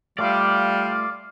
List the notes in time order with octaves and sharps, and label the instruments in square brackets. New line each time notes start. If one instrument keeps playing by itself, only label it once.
[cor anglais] G3 [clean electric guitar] A3 F4 [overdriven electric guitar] D5 [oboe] F5